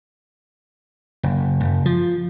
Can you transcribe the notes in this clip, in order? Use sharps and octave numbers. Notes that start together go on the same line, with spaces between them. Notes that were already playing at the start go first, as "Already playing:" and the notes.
F#1
F#1
F3